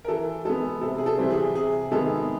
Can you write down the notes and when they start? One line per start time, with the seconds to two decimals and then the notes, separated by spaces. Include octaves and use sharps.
0.05 A#4
0.08 E3 A4
0.45 G#3 B3 A4
0.81 C3 A4
0.98 G#4
1.06 A4
1.18 E3 G3 C4
1.30 G#4
1.55 C3 G#4
1.91 D#3 G#3 B3 A4